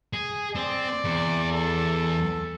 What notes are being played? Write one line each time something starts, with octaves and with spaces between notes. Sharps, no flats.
G#4
C4 D5
E2
A4